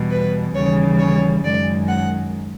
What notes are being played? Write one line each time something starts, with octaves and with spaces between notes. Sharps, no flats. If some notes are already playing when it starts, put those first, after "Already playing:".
Already playing: E2 B2 G3
B4
D#2 C#3 E3 G3 C#5
C#5
F#2 D#3 G#3 D5
F#5